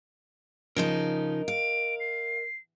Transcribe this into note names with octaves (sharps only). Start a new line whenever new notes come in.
C#3 F3 D#4 A#4 D#5
F5 D7
C7